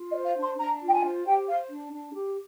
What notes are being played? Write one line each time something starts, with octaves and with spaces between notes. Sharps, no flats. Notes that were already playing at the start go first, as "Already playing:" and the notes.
Already playing: F4
D#5
C5
F5
D4 C6
D4 A#5
F4
G5
G#5
C5
G4 G5
C5 F5
D4
D4
G4